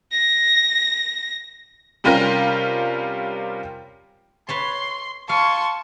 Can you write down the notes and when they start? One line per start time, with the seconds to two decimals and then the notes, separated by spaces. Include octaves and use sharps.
0.12 A#6
2.04 C3 G3 C#4 F4 G4 A#4
4.49 B4 C#5 A5 C6
5.29 F5 G#5 A5 C6 C#6